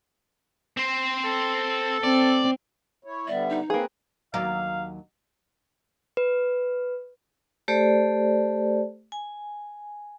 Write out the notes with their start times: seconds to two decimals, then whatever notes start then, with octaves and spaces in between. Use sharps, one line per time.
0.77 C4 C5
1.24 A4
2.04 C4 D5
3.04 E4 C#5
3.28 D3 G3 B3 D5 E5
3.49 D#4
3.70 A#3 C4 G#4 B4 F5
4.34 D#2 F#3 D5 F5
6.17 B4
7.68 A3 G4 A4 C5 D5
9.12 G#5